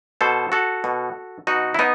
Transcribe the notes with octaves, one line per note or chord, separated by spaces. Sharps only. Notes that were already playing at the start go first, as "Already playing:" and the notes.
B2 A4 C5
F#4 A4
B2
B2 D#4 F#4
E4
B3 D#4